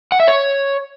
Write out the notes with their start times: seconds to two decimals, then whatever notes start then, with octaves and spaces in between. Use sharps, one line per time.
0.12 F#5
0.20 E5
0.27 C#5